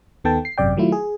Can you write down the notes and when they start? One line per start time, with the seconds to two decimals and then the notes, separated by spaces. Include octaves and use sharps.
0.24 D#2 D#3 B3 A4 G5 A5
0.45 C7
0.58 G#1 F#2 C3 D5 G5
0.77 D#3 F#3 A3 E4 F4
0.92 G#4